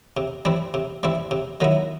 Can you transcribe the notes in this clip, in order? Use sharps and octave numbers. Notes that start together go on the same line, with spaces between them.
C3
E3 G3 C4 E4
C3
E3 G3 C4 E4
C3
D#3 F#3 B3 E4